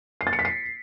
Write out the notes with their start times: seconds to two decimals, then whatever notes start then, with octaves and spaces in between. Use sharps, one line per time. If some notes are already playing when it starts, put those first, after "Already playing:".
0.21 C7
0.27 A6
0.33 C#7
0.39 B6
0.45 C7